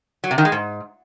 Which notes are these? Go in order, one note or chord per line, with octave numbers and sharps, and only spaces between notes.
F#3
C3
D#3
G#3
G#2